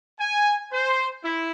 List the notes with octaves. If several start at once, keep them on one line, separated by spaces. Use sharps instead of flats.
G#5
C5
E4